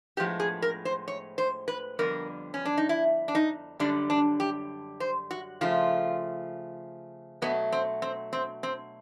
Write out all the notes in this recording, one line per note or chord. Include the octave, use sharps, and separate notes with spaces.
A2 F3 G#3 B3 G4
G#4
A#4
C5
C#5
C5
B4
F2 D3 G3 B3 A#4
C#4
D4
D#4
E4
D4
D#4
F#2 D3 G3 D4
D4
G4
C5
F#4
C#3 F3 A3 F4
B2 F#3 A3 B3
C4
C4
C4
C4